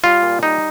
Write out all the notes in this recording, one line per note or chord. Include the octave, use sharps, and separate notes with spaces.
G3 F4
A#2
G3 D#4